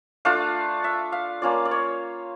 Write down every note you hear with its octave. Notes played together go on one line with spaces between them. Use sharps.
A3 D4 F4 F5
E5
F5
A#3 C#4 F4 D5
D5
C#5